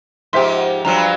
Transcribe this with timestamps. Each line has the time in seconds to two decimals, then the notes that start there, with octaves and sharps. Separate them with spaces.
0.33 G#2 F3 G4 C5 E5 C6
0.85 G2 F3 F#3 A#5
0.97 B5